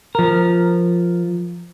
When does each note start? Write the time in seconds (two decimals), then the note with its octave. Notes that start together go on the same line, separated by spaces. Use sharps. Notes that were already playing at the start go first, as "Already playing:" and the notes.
0.15 F3 A#4